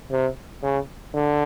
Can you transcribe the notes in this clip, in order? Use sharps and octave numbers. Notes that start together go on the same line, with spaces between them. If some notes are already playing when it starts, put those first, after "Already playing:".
C3
C#3
D3